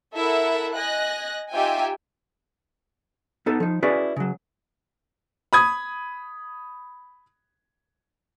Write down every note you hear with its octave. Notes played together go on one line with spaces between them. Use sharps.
E4 A4 A#4 E5 F#5
D#5 G#5 F#6 A#6
D#4 F4 G4 E5 G5 G#5
B3 D#4 A4
F3 D#4
C#4 E4 F#4 G#4 B4 D5
C#3 F#3
B5 D#6 G#6